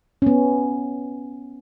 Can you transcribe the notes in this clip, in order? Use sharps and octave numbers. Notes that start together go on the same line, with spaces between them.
B3 C#4